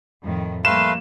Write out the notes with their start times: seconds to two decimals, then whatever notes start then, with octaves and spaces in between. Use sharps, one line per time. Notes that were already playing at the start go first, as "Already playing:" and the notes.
0.22 F2 A2 D#3
0.65 F3 G3 A3 A#3 B4 F5 C6 E7